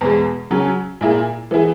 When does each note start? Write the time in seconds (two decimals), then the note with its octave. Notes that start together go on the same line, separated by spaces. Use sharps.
0.01 E2 B2 G#3
0.51 C#3 F#3 C#4
1.01 A#2 A#3 E4 G#4
1.51 E3 B3 E4 G#4